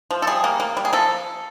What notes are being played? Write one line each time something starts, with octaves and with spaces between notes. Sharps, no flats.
F3
A4
G3 G#4
A#3
A#3
G3
G#4
F3 A4